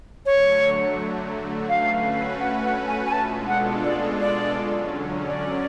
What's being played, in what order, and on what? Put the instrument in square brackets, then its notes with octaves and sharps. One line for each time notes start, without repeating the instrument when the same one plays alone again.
[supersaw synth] D3 F#3 A3 [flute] C#5
[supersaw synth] A3 C#4 F#4 B4 [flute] F5
[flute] F#5
F#5
G#5
G#5
[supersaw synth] B2 G#3 D4 F4 A4 [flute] A5
[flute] F#5
D5
D5
[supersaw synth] D3 F#3 C#4
[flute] D5